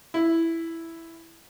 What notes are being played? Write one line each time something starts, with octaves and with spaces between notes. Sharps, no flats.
E4